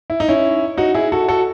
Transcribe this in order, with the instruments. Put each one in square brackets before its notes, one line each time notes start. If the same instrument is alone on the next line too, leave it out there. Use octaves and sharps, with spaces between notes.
[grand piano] E4
D#4
C#4 E4
D#4 F#4
E4 G#4
F#4 A4
F#4 A4